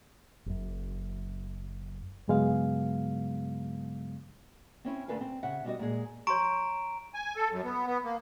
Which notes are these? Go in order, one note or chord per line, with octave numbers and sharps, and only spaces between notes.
F#1 F#2
G2 C#3 F#3 G#3 B3 F5
C4 C#4 E4
D2 C#3 A4 B4 F5 G#5
C4
C#3 E5 F#5
B2 G3 F#4 D#5
A#2 G#3 G#4
C#5 A#5 C6 C#6 D7
G#5
A4
F#2
B3
B3
A#3